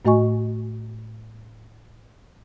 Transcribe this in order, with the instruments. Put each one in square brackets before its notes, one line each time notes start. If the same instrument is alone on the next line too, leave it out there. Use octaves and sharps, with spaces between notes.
[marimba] A2 A3 F#4 D#5 G#5 C#6